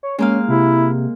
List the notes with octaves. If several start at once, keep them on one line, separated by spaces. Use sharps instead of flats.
C#5
G#3 A#3 C#4 F5
C3 E4